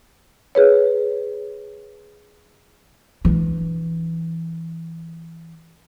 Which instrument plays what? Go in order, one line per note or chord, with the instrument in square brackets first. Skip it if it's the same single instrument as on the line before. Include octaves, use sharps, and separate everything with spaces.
[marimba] G#4 B4 C#5
[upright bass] E3 D4